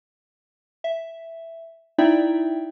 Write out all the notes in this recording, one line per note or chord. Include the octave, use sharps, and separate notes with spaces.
E5
D#4 E4 D5 E5 G5